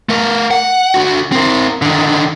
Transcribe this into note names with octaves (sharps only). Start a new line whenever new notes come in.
A3 A#4
F#5
D3 F#4
C4 A#4
D3 D#3